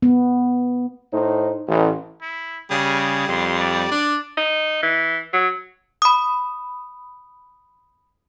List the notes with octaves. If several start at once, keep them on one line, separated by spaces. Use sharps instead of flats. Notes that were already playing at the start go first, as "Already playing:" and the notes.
B3
A2 D#4 C5
A1
E4
C#3 G3 G#4
F2 C6
D5
D4
D#4
E3
F#3
B5 D#6